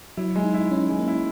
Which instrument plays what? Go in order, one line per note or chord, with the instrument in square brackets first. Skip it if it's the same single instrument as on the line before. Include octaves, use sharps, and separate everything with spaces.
[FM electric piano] F#3 [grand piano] E4
[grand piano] G#3
[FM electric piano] D#4
[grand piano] E4
[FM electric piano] C#4 [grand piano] E4
[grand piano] G#3
[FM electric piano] A#3
[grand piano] E4